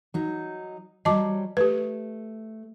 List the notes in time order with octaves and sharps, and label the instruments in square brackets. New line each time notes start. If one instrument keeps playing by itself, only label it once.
[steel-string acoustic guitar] F#3 D#4
[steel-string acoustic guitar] F#3 G3 [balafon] D#5 A5 D6
[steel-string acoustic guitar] A3 [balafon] G4 B4